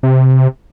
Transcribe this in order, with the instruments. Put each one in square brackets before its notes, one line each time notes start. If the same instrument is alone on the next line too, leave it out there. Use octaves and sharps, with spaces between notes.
[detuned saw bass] C3